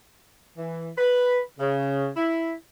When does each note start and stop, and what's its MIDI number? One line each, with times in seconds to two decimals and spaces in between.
0.57 0.90 52
0.98 1.40 71
1.58 2.08 49
2.17 2.52 64